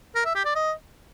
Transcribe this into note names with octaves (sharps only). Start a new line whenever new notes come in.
A#4
E5
G4
D5
D#5